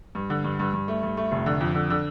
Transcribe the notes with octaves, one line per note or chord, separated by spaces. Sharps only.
G2
D3
G2
G2
G2
A3
G2
A3
F1
D3
F2
D3
D3